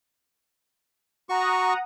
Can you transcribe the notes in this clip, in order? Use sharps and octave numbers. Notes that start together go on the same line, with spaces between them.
F#4 F#5 A#5 C#6 D#6